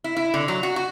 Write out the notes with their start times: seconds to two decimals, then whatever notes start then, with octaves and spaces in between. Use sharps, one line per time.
0.04 E4
0.17 E4
0.34 D3
0.48 F#3
0.63 F#4
0.76 F#4